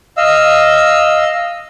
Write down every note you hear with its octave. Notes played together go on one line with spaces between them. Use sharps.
D#5 F5 E6